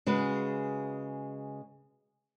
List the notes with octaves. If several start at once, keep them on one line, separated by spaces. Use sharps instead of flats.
C#3 G#3 F#4 B4